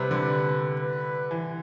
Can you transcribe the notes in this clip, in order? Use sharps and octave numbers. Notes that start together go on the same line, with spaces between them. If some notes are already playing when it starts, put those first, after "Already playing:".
Already playing: C3 G3 B4
D3
B4
E3